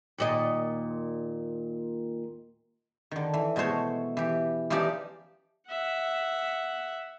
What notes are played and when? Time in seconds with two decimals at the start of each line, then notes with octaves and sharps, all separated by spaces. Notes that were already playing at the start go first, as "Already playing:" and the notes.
0.18 D#2 A#2 D#5
3.11 D3 D#3
3.34 E3
3.56 B2 G#3 A3 C5 C#5
4.17 E3 G4
4.70 E3 F3 C#4 D#4 G4 D5
5.68 E5 F#5